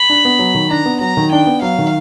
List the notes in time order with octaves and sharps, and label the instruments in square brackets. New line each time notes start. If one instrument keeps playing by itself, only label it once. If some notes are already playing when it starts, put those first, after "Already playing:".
Already playing: [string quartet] B5
[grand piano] D4
B3
F#3
D#3
[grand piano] D4 [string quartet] A#5
[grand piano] B3
[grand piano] F#3 [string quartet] A#5
[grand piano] D#3
[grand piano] D4 [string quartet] G5
[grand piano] B3
[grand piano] F#3 [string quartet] F5
[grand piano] D#3